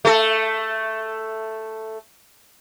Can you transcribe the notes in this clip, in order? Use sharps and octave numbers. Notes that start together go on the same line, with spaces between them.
A3 A4